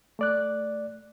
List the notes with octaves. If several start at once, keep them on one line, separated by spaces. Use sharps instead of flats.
A3 D5 F#6